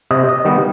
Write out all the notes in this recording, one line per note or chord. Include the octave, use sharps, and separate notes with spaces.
C3 D#5
D#5
D#3 G3 B3